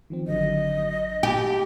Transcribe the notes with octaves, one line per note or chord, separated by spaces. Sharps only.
D#3 F3 C4
G#1 D3 F#3 D#5
F#4 G4 A5 B5